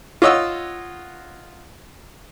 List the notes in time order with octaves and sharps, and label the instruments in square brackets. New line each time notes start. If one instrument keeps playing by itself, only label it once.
[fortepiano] F4 C#5 D#5 F#5 E6